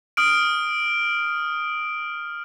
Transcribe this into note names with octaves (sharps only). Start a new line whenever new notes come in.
D#6 F6 D7